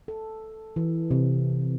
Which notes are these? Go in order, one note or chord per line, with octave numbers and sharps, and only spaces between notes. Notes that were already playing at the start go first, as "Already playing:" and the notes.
A4
E3
C3